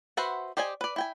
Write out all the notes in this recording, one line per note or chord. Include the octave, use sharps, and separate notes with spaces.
F#4 B4 C5 E5 F#5
G4 C5 D5 D#5 G#5
B4 D5
E4 G5 G#5